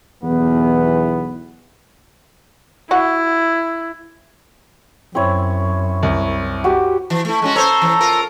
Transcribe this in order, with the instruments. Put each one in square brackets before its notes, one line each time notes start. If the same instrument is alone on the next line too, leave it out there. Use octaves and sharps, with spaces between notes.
[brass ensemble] B1 E2 E3 B3
[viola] E4 [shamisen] F#4 F#5
[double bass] F#2 [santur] C4 E4 C#5
[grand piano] C2 [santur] A#4
[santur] F#4 G4
[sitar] E3
A3 E4
G#3 C#4 F#4
[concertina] A4 A#5 [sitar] C5 C#5
[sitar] E3
F4 A#4